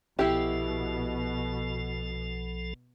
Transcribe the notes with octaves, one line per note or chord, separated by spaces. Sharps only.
B1 B2 F3 E4 G4 A4